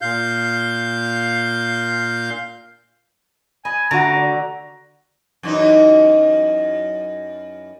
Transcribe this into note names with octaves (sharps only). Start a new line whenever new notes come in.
A#2 F5 G6
D#5 G#5 B5
D3 A3 F#4 A#5
D5
F#2 E3 D#4